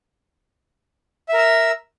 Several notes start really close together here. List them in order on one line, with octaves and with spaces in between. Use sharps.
E5 A#4 E6